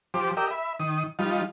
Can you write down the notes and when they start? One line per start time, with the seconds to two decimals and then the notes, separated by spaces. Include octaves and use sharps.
0.14 F3 G4 C5 D6
0.37 G4 A#4 D5 D#5 G5 E6
0.51 E5 B5
0.80 D#3 D#6
1.19 F3 G3 D#4 F4